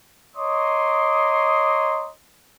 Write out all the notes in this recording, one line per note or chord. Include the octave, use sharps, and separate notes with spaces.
C#5 D#5 A#5 C6 D6 D#6